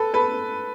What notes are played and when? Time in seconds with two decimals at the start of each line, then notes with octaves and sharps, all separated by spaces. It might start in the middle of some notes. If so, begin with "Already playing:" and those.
Already playing: A4 B4
0.14 A4 B4